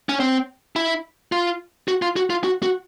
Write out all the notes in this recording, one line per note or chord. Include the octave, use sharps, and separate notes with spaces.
C#4
C4
E4
F4
F#4
F4
F#4
F4
F#4
F#4